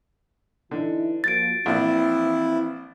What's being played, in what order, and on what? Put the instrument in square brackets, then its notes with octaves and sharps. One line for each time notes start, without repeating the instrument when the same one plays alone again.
[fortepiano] D3 [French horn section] E3 D#4 E4
[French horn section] F3 A#3 F#4 [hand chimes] A6 D7
[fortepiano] A#1 [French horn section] E3 C4 [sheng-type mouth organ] E4